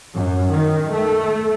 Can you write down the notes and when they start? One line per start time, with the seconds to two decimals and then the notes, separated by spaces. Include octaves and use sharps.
0.15 F#2
0.52 D#3
0.92 A3